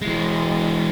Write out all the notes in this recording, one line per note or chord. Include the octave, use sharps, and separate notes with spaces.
E3 G#3